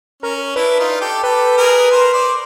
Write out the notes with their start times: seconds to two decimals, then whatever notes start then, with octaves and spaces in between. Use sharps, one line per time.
0.23 C#4 A#4
0.56 D4 E4 B4
0.79 D#4 F4
1.01 G4 A4
1.23 G4 A4 B4
1.57 G#4 A#4
1.91 A#4 C5
2.13 C5 D5